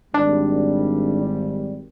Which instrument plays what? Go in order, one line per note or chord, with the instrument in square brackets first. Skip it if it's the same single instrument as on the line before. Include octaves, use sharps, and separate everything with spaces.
[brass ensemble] G#1 G3 [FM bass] D4